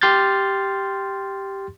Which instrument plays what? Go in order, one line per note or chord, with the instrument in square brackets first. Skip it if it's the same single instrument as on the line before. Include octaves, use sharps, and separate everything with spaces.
[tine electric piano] G4 C6 F6 G6 A6